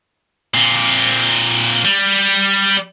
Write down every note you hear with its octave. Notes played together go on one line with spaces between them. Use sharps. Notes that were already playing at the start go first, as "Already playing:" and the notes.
A#2 C4
G3